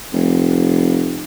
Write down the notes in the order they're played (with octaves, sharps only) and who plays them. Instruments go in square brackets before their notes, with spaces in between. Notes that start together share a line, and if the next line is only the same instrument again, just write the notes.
[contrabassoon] F1